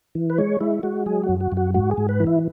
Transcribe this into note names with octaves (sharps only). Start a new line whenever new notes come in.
E3
B4
G#3 C#5
G#3 E4
G#3 F#4
F#3 G#4
F#4
F#2
F#4
F#2
F#4
G#2 F#4
G#4
G#2
B4
E3
E4